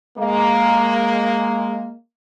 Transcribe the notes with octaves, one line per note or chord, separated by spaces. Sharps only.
G#3 A#3